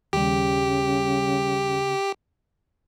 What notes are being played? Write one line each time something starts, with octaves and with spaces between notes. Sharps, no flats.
D#2 C#3 G3 G4